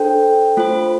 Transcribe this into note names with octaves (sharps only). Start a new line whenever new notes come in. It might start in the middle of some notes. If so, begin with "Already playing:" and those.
Already playing: D4 A4 C5 G5
A3 F4 C5